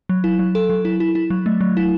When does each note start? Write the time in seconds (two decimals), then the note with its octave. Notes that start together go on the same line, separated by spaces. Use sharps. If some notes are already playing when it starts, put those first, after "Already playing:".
0.09 F#3
0.24 E4
0.39 F#3
0.55 A4
0.70 F#3
0.85 E4
1.00 E4
1.15 E4
1.30 F#3
1.46 A3
1.61 F#3
1.77 E4